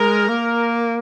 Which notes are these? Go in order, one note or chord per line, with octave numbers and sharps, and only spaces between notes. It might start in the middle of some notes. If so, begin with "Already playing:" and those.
Already playing: G#3 A#4
A#3